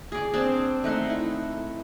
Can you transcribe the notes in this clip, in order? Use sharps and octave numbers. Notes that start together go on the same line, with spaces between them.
G#4 D5
C4 D4 D5 A5
A3 D#4 F#5 C6
E4